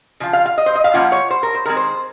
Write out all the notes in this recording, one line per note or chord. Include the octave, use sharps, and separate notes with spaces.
C#3 F3 F4
F5
F5
D#5
C5
D#5
F5
F3 A#3 C#4 F4 F#5
C#5
C5
A#4
C5
D#3 G#3 C4 A#4
C5